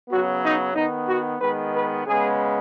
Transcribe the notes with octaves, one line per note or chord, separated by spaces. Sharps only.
C#3 F#3 B3 F#4
D#4
D#3 B3 D#4
F#4
D#3 G#3 B3 B4
B4
C#3 G#3 B3 G#4